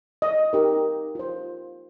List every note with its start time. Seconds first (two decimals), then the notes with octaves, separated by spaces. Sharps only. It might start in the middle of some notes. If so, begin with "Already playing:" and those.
0.22 D#5
0.53 D#4 G4 A#4
1.15 F4 C5